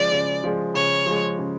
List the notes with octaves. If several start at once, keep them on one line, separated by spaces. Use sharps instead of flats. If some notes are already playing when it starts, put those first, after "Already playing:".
Already playing: C#3 F3 G#3 D5
C#3
F3 G#3
C#3 C#5
F3 G#3
C#3